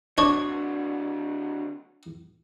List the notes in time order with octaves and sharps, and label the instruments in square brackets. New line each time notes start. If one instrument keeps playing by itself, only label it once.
[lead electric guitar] D3 F#3 [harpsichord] D4 C#5 [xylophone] C#6